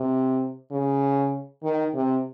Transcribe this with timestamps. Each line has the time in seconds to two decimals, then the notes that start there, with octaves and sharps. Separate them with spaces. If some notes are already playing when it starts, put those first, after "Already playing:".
Already playing: C3
0.72 C#3
1.63 D#3
1.95 C3